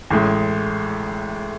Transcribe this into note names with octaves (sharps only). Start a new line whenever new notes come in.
A1 A2 G#3